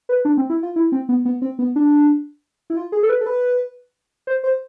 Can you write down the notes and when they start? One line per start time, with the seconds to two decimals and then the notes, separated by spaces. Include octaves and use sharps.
0.09 B4
0.25 D4
0.37 C4
0.50 E4
0.63 F4
0.76 E4
0.92 C4
1.09 B3
1.25 B3
1.42 C4
1.59 B3
1.76 D4
2.70 E4
2.77 F4
2.92 G#4
3.03 A4
3.09 B4
3.21 A4
3.26 B4
4.27 C5
4.44 C5